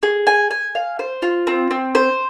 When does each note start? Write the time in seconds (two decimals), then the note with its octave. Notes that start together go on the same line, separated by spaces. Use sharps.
0.03 G#4
0.27 G#5
0.51 G#5
0.75 F5
0.99 C5
1.22 F4
1.47 C4
1.71 C4
1.95 C5